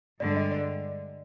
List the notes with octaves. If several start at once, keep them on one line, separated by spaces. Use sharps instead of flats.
G2 D3 G#3 D5
D#5
D5